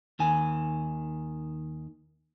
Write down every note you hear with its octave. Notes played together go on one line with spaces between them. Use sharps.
D#2 D#3 G#5